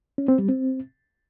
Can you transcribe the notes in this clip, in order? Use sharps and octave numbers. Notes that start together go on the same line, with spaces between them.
C#4
C4
G3
C4